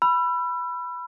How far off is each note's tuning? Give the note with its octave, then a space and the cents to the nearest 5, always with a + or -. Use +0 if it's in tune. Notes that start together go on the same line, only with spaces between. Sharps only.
B5 +0 E6 +35